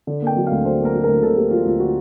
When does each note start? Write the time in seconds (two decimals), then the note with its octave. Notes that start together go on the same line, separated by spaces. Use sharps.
0.07 D3
0.22 A#3 G5
0.37 F#3
0.47 D2 F5
0.65 D3 C5
0.80 A#3 A#4
0.94 F#3
1.04 A#4
1.09 D2
1.23 D3 A4
1.37 A#3 G4
1.51 F#3 F4
1.66 D2 F4
1.80 D3 F#4